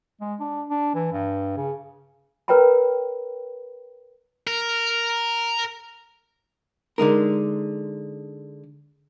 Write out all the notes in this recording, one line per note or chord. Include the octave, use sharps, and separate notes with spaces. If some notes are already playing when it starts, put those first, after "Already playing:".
G#3
D4
D4
E3
G2
C#3
A#4 B4 C#5 G5 A#5 B5
A#4
D3 G#3 D#4 A#4